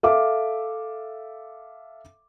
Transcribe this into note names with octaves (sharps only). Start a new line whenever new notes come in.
A4 E5 F5 D6